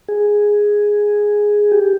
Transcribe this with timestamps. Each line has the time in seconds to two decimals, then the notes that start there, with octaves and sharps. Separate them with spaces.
0.09 G#4
1.72 G4